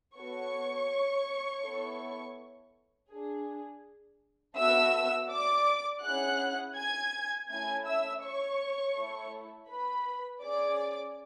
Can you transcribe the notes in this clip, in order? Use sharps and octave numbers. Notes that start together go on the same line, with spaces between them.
B3 F#4 A4 C#5 C#6
B3 E4 A4
D4 G#4
B3 F#4 A4 E5 E6
D5 D6
C#4 E4 G#4 F#5 F#6
G#5 G#6
A3 C#4 E4 G#5 G#6
E5 E6
C#5 C#6
A3 E4 A4
B4 B5
C#4 G#4 D5 D6